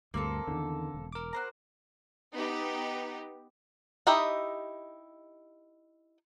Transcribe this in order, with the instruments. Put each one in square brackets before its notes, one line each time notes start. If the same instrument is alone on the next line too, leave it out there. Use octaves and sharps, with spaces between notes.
[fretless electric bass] D2 G2 [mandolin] A#3 C4 A4
[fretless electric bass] E2 D#3 [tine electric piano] D3
[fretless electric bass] E1
[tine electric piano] A#4 D6
[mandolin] F#4 C5 A#5
[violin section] B3 D#4 G4
[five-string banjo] D#4 E4 G4 D#5 E5